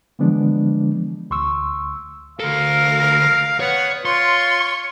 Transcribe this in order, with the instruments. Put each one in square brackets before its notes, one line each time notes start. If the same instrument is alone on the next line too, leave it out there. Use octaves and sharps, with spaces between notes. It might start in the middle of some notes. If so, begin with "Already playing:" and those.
[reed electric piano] D3 E3 F3 G#3 B3 D4
D2 C6 C#6 E6
[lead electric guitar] D2 A4 [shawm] A#4 [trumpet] F5
[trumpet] B3 [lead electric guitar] C#5 [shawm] F#5
[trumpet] F4 [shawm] C#5 [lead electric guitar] C6